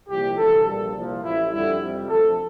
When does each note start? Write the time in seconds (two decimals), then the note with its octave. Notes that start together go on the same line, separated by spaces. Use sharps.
0.09 C2 A#2 F3 G4
0.38 D2 C3 E3 G3 A4
0.66 A#1 A#2 G3 A4
0.95 C2 A#2 F3
1.23 A1 A2 F3 E4
1.52 F2 D3 G3 E4
1.80 F2 C3 G3
2.08 D2 C3 F3 A4